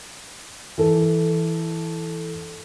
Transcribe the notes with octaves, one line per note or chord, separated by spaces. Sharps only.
E3 A4